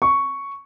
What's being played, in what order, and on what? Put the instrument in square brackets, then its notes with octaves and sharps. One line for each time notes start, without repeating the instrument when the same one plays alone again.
[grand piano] C#6